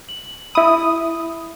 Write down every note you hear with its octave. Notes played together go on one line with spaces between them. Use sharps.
F#7
E4 E5 B5 D#6